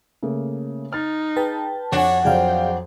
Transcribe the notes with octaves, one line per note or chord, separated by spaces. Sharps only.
C#3 A3 A#3
D#4 F6 A6
G#4 B4 G5 A5
F2 D4 F#4 C#5 G#5
F2 F#3 G#4 C5 D5 F5 G5